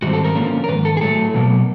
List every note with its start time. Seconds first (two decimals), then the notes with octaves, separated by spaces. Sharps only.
0.02 G#2 D#3 G3 C4 F#4
0.13 A4
0.24 A#4
0.35 D3 F3 A#3 C#4
0.64 A#4
0.68 G#2 D#3 B4
0.85 A4
0.97 G#4
1.01 A2 F#3 A3 A4
1.34 B2 F#3 A#3